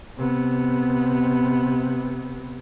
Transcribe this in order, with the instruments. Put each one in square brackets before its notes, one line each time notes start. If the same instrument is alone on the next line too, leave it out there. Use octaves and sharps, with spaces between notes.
[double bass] C3 B3